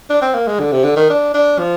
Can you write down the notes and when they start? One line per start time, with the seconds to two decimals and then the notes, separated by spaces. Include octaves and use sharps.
0.10 D4
0.22 C4
0.35 A#3
0.47 G#3
0.60 D3
0.72 C3
0.84 D3
0.96 D#3
1.10 D4
1.34 D4
1.59 F3